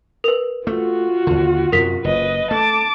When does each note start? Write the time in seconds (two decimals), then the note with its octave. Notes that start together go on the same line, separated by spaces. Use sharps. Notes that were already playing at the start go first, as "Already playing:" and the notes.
0.24 A#4 B4
0.67 A3 F4 F#4
1.27 D#2 D3
1.72 F#2 C3 F#3 A#4 B6
2.04 F#1 B4 D#5
2.51 A3 A5 D6